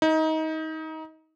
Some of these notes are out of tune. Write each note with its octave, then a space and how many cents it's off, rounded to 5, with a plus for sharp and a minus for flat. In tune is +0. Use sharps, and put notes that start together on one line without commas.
D#4 +25